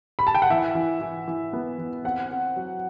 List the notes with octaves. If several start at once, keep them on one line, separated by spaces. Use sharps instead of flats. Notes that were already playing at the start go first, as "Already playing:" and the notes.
B5
A5
G5
F#5
E3 E5
E3
E3
E3
B3
E3
C4 F#5
C4
F#3